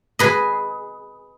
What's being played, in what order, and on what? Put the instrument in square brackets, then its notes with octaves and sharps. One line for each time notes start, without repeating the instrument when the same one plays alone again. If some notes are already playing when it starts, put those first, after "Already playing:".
[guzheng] G#4 B4 D#5